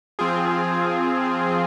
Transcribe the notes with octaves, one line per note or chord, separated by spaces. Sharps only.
F3 C4 F4 G#4